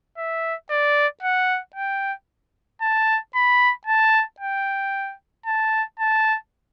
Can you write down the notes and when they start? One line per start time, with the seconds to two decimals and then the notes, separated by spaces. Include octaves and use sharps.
0.18 E5
0.71 D5
1.23 F#5
1.76 G5
2.82 A5
3.35 B5
3.87 A5
4.40 G5
5.46 A5
6.00 A5